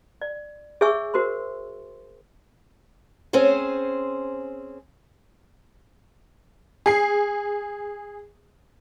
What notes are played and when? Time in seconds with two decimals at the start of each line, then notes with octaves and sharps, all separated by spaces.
0.22 D5
0.81 G#4 C#5 E5 G#5 C#6 E6
1.14 F#4 A#4 C5 C6
3.33 C4 C#4 G#4 C5
6.86 G#4 C7